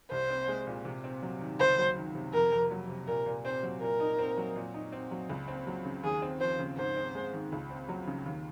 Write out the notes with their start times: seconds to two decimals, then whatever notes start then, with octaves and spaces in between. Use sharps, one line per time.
0.11 C2 C5
0.30 C4
0.48 G#3
0.67 A#2
0.85 C3
1.04 C4
1.22 F#3
1.41 D#3
1.60 C#2 C5
1.78 F#3
1.96 D#3
2.15 C3
2.33 F2 A#4
2.52 F2
2.71 F#3
2.89 C3
3.07 A#2 A#4
3.26 A#2
3.45 C4 C5
3.63 F#3
3.81 A#2 A#4
4.00 D#4
4.18 C4
4.37 F#3
4.56 A#2
4.74 D#4
4.92 C4
5.11 F#3
5.30 C#2
5.48 C4
5.67 F#3
5.85 C#3
6.03 D#2 G#4
6.22 C4
6.40 F3 C5
6.59 C#3
6.77 G#2 C5
6.97 C4
7.15 G#3
7.33 D#3
7.52 C#2
7.70 C4
7.88 F#3
8.07 C#3
8.26 D#2